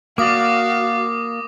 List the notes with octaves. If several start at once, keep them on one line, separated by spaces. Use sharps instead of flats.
A#3 F#4 D5 F5 D6 D#6 A#6